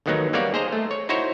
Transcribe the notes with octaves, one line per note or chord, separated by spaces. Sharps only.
A1 D#2 D#3 F#3 B3 D#4
G3 A#3 B3 D#4 C#5 D5
G#4 C5 D#5 A#5
A3
C#5
D#4 E4 F#4 C5 C#5